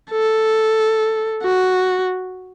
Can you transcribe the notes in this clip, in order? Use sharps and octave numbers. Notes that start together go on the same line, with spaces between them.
A4
F#4